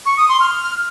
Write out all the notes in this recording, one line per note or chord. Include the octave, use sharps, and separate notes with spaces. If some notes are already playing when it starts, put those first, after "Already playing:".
C#6
D#6
C6
F6